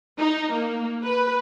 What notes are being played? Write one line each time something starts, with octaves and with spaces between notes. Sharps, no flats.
D#4
A#3
B4